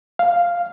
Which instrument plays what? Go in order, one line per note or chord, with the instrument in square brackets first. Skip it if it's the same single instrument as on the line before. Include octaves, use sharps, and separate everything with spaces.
[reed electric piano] F5